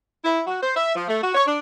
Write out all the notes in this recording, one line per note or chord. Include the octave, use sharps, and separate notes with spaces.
E4
F#4
C5
E5
F3
A3
F#4
C#5
D4